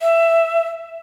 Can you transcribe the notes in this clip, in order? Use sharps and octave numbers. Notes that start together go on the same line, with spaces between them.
E5